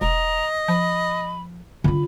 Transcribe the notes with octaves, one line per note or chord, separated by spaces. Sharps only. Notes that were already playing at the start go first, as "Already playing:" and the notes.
E1 D#5 A#5
F3 B5
D3 F4 B5